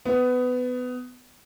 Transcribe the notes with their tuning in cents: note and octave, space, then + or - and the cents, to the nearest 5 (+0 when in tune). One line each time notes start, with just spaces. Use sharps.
B3 +20